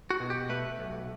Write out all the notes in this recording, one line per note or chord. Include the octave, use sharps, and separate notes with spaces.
F#4
B2
G4
A3 B4
B1